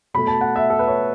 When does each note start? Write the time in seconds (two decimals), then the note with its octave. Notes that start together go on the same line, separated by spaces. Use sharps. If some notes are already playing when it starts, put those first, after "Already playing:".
0.14 B2 A3 B5
0.27 A5
0.41 F#5
0.56 E5
0.70 A4
0.79 B4
0.88 C#5